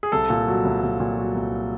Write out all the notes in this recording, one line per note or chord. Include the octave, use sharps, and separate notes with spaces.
G#4
C2 A4
A#2
F#3
C2
C2
A#2
F#3
C2